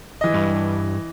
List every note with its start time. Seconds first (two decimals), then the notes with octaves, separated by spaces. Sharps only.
0.21 E3 D#5
0.34 G2